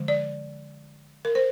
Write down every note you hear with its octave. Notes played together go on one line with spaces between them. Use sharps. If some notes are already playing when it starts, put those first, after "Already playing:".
Already playing: D3 F3 G#3
D5
A#4
C5